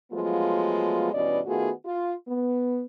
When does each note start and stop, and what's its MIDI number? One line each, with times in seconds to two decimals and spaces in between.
0.12 1.08 53
0.12 1.08 54
0.12 1.08 56
0.12 1.08 57
0.12 1.08 59
0.12 1.08 65
1.13 1.40 43
1.13 1.40 47
1.13 1.40 52
1.13 1.40 61
1.13 1.40 74
1.13 1.40 75
1.46 1.70 51
1.46 1.70 57
1.46 1.70 59
1.46 1.70 65
1.46 1.70 66
1.46 1.70 68
1.85 2.13 65
2.27 2.84 59